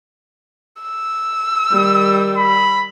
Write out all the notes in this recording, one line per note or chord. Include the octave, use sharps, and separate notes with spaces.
E6
D#3 G3
B5